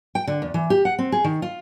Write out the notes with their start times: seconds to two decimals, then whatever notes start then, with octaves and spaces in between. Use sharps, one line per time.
0.15 G5
0.27 D3
0.42 E2
0.54 E3
0.70 G4
0.85 F#5
0.99 C4
1.12 G#4
1.24 D#3
1.42 F4